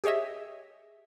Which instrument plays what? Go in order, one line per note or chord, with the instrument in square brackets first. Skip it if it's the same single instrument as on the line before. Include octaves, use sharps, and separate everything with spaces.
[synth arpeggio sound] G4 G#4 C#5 D#5 E5